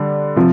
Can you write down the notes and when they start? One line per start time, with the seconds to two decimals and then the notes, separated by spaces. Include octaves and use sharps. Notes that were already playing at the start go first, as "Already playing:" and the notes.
Already playing: D3 G3 D4
0.36 C3 F3